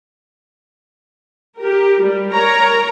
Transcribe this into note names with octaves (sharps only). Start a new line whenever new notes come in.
G4 A#4
G3
A#4 C#5 A#5